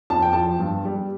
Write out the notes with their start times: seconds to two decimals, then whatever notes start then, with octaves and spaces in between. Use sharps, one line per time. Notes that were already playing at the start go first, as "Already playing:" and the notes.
0.10 F2 A5
0.22 G5
0.33 F3 A5
0.59 G2
0.85 G3